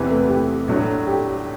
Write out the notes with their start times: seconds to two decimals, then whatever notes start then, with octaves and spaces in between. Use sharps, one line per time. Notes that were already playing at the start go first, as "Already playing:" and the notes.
Already playing: E2 C3 E3 B3
0.10 A3
0.29 G4
0.68 A2 F#3 A3 D4
1.07 G4